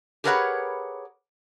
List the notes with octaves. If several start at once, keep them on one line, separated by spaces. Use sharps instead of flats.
G4 G#4 A#4 B4 C#5 F#5